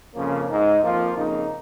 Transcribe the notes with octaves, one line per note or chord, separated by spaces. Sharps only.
F2 C#3 F3 A#3 C#4
G#2 G#3 D#4
F2 F3 A#3 F4
F2 C#3 A#3 D#4